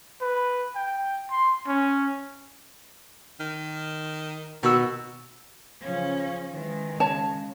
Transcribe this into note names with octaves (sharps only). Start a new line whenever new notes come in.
B4
G5
C6
C#4
D#3
B2 D#3 F#4 E6
C#3 F3 C#4
D#3 E3 G#3
C#3 C#5 A5